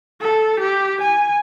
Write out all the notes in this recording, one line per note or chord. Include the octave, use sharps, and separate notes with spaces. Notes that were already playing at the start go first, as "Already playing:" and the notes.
A4
G4
G#5